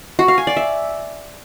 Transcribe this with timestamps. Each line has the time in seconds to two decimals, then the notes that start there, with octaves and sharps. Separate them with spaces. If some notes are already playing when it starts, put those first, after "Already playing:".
0.19 F#4
0.28 F5
0.38 G#5
0.47 D5
0.57 E5